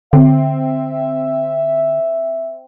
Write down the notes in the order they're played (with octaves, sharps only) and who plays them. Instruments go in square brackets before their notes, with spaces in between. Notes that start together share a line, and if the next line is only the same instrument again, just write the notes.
[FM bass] D3 [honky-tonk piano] C4 [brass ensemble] E5